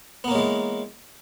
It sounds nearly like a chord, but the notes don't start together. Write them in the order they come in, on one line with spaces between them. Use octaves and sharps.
B3 A#3 C#4 G#3 E3